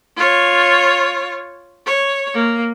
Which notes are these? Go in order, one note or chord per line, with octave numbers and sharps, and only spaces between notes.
F4 C#5
C#5
A#3